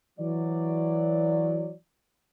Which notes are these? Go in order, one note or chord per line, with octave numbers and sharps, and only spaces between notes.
E3 F#3 D5